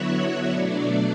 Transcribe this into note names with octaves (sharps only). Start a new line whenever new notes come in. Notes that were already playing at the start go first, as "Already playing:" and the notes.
Already playing: D3 F#3 B3 E4 F#4 C#5 E5 F#5
B2 F#3 A3 D4 D5